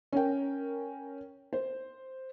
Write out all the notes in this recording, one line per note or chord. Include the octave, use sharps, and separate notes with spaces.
C#4 A#4 G5
C5